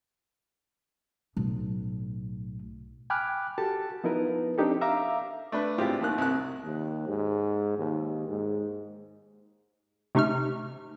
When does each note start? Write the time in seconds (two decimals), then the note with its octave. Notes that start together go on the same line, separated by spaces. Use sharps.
1.37 B1 A2
3.10 G5 G#5 B5 D6 F6 F#6
3.58 F#4 G4 A4 A5
4.04 F3 B3 D#4 E4 A#4 B4
4.58 C4 D4 D#4 G4 A4
4.81 E5 F5 A#5 D6
5.52 A3 D4 B4
5.78 A2 G#3 C4 E4 F4 G4
6.01 D#2 D#3 F#6
6.18 C2 F#6
6.64 D#2
7.08 G#2
7.78 D#2
8.29 G#2
10.15 C3 A3 D#4 C#6 F6